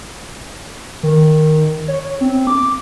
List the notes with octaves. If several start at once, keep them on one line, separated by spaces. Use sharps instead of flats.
D#3
C#5
C4
D6